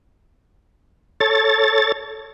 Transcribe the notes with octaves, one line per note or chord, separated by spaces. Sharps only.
A4 C#5 A6